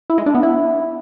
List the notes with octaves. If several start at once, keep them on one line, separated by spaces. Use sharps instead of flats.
E4
G#3
D4
B3
E4